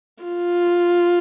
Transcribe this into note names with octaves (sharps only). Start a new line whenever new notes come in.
F4